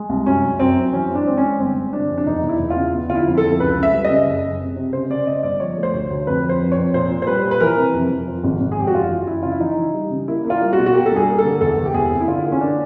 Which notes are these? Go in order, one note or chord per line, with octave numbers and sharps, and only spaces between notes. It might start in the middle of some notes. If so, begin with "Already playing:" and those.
Already playing: G#3
C2
F#2 C#4
F#2
F#2 C4
F#2
E3 C#4
G#3
D4
G#3 C4
C#4
G#3
G1 C4
G1
C3 D4
F2
D4
E2 D#4
E2
E4
E2
F4
C#3
B3
D3 F4
E4
F2
A4
F2
C#2 B4
C#3
E5
G3
D#5
C#3
F#1
F#1
C3
C3
C#3 C5
C#3 D5
C#3 D#5
G1 D5
F3 C#5
A3
C5
D2 C#5
D2
F2 B4
F3
C5
F2
F2 C#5
A#2 C5
A#2
C5
G3 B4
A#2
B4
E3 A#4
C3
F2
F2
F3
G#1
G#1
G#4
F3 G4
F#4
F#1 F4
E3
F#1 E4
C#3 F4
E4
E3 D#4
E3
G3
C#3
A#3 E4
A#3
F4
G3
F#4
B2
F#4
A#3 G4
A4
G2 G#4
A#3
A4
D3
E2 A4
E2
G4
E2 G#4
C3
E4
D3 F4
A#3
C#4
A#3 D4